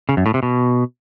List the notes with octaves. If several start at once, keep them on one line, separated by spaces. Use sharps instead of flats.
C#3
F#2
A2
C3
B2